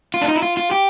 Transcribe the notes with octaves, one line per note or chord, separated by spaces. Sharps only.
F4
D4
D#4
E4
F4
F4
G4